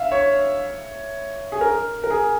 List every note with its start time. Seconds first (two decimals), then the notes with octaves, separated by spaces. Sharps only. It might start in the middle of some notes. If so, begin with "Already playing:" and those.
Already playing: E5 F5
0.12 C#5
1.52 G#4
1.61 A#4
2.04 A#4
2.11 G#4